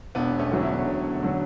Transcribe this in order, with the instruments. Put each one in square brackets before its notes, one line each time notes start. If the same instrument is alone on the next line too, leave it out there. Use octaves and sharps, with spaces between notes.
[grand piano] E1 [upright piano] B3 D4
[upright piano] A3 C#4
[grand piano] D2 D3 F#3
[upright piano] C#4 E4
[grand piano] E1
D3 F#3